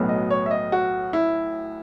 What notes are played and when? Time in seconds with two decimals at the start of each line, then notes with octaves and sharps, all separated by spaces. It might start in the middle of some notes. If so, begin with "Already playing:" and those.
Already playing: B1 A2 F#3 B3
0.09 D#5
0.30 C#5
0.46 E5
0.51 D#5
0.72 F#4
1.13 E4